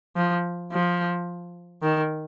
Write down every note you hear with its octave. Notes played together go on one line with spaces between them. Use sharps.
F3
F3
D#3